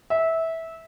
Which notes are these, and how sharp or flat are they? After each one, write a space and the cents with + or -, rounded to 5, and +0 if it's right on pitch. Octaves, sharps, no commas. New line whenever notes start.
E5 -15